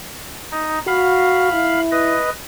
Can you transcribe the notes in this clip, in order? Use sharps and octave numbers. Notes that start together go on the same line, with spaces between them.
D#4
F#4 F5 B5
E4
B4 D#5